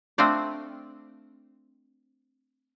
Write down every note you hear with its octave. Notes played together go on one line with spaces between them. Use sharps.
A3 C4 D4 F4 C5 D5